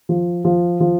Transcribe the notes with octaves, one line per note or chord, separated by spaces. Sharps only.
F3
F3
F3